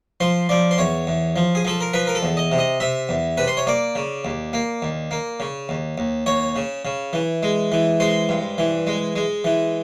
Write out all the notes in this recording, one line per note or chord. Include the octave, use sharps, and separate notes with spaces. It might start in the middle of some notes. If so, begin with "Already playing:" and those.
F3 C5
F3 D5
C5
E2 C#5
E2
F3
G#4
F3 A4
A#4
F3 B4
A#4
A4
E2
D#5
C3
D#5
C3 E5
E2
C3 B4
C5
C#5
A#3 D5
C#3
D#2
A#3
D#2
A#3
C#3
D#2
D#2
D#2 C#5
C#3
C#3
E3
G#3
E3
G#3 C5
G2
E3
G#3
G#3
E3